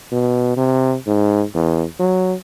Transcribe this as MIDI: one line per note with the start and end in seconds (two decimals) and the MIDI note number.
0.12 0.54 47
0.57 0.95 48
1.06 1.44 44
1.55 1.84 40
1.99 2.34 54